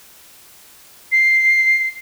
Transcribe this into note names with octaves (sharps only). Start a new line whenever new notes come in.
C7